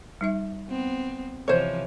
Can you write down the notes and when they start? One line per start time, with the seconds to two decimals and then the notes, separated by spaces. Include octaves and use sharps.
0.21 G3 D#4 E5
0.68 B3 C4
1.48 C3 E3 F3 C5 C#5 D#5